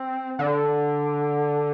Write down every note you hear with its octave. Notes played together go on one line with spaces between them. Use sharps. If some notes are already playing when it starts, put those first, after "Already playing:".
Already playing: C4
D3